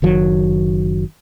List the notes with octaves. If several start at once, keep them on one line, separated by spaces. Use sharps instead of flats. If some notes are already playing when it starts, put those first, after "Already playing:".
F#1 D#3 F#3